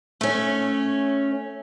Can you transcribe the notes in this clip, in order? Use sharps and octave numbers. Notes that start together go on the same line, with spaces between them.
A3 C#4